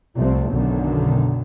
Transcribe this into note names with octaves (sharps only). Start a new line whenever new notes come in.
C2 F3 A3 C4
B1 F#2 D3 D#3